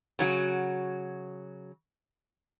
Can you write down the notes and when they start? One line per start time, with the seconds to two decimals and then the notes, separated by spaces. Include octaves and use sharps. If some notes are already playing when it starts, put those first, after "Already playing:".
0.19 C#3 F#3 F#4